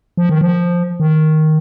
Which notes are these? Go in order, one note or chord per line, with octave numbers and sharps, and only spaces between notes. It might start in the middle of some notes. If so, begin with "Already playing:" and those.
F3
D#3
F3
D#3